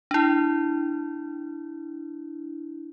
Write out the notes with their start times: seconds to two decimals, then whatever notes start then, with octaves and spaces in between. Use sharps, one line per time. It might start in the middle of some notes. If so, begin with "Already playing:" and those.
0.11 D4 E4